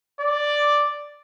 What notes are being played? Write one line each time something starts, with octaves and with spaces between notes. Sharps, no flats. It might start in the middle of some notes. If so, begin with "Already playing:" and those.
D5